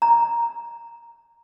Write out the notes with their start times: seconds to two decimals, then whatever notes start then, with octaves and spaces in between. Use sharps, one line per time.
0.02 A#5